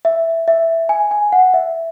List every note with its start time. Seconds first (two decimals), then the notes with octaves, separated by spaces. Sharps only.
0.05 E5
0.48 E5
0.89 G#5
1.11 G#5
1.32 F#5
1.54 E5